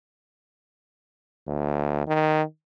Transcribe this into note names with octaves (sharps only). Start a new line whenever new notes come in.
D2
D#3